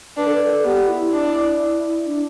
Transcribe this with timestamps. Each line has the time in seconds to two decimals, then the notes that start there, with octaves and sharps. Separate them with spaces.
0.17 D4 B4
0.27 A4
0.33 B4
0.49 A4
0.64 B3 G4
0.88 E4
1.12 D4
2.06 D4